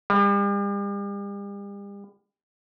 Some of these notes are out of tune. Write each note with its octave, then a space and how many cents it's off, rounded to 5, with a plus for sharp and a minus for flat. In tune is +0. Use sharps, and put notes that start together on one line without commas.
G3 +40